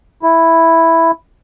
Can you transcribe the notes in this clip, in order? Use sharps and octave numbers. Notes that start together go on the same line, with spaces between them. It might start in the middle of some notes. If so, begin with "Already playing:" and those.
E4